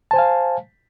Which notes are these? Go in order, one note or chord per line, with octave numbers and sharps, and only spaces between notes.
C5 F5 G#5 A5